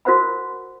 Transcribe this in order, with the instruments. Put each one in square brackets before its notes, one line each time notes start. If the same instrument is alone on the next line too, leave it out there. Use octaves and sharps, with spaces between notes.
[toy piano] F#4 A#4 C5 F#5 B5